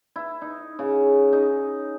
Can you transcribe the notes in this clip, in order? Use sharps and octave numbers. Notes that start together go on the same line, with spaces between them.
E4
D#4
C#3
D#4